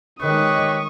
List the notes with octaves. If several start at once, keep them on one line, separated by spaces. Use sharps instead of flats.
D#3 G#3 G4 B4 C#5 D#5 C#6 D#6